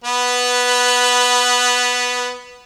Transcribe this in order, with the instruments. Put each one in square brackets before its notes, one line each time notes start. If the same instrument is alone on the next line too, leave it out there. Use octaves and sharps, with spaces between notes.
[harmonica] B3 B4